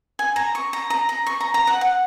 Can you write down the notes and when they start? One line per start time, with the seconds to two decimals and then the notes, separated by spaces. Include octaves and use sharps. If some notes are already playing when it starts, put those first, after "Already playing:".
0.19 G#5
0.36 A#5
0.55 C#6
0.73 A#5
0.90 A#5
1.09 A#5
1.26 C#6
1.41 A#5
1.54 A#5
1.67 F#5
1.81 F#5